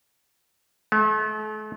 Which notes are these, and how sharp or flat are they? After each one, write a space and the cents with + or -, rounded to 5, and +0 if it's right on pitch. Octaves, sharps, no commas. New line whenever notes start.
A3 -40